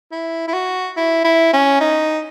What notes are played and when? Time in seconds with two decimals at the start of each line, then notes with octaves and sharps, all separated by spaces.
0.12 E4
0.48 E4
0.54 F#4
0.97 E4
1.24 E4
1.53 C#4
1.80 D#4